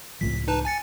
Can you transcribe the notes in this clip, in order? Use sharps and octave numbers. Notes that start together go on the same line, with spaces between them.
C#2 A2 F3 B6
D#4 B4 A5
G#5 A6 C#7